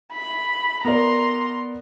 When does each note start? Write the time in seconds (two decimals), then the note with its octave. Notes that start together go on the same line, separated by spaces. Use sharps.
0.13 B5
0.85 B3 A#4 D5 A#5 C6